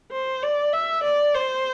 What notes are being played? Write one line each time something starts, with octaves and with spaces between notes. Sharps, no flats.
C5
D5
E5
D5
C5